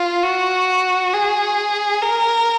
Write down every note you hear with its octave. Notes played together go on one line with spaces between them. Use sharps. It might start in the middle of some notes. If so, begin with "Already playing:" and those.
Already playing: F4
F#4
G#4
A#4